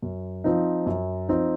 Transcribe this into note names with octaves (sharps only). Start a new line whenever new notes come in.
F#2
F3 C4 D#4
F#2
F3 C4 D#4